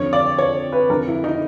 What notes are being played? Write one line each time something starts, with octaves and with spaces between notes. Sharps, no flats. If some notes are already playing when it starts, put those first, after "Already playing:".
Already playing: F2 D3 C#5
D5
C#5
B4
F2 D3 A#4
E4
D#4